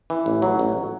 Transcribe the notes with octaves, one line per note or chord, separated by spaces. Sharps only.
E3
A1
F#3
A1